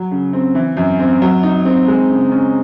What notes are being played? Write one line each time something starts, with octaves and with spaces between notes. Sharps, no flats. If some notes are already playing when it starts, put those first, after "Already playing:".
Already playing: F#3
C#3
C4
E3
F#2
C4
F#3
D#4
C4
G#3
C#3
C#4